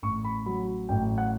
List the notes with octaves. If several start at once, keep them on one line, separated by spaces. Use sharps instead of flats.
A1 C#6
B5
F#3 B5
A1 G5
F#5